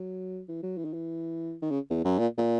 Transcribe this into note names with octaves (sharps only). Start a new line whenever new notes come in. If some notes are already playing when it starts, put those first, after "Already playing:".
Already playing: F#3
E3
F#3
E3
D#3
E3
D#3
C#3
E2
F#2
A#2
A#2